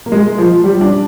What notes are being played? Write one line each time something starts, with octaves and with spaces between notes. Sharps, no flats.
A#3
G#3
F3
G3
D4